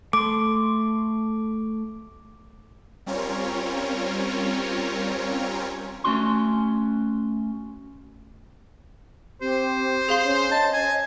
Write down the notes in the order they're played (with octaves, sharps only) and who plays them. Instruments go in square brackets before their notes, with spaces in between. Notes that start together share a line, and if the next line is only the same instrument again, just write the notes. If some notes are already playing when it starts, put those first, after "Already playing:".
[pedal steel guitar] A3 C6 [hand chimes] D6
[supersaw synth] G3 C4 C#4 F4 A#4 C#5
[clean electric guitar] A3 C#4 F#4 C6
[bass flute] C4 [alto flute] G4 [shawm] C5
[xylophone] G#4 F5 C6
[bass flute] C#4 [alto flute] C#5
[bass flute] D#5 [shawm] A5
[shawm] G#5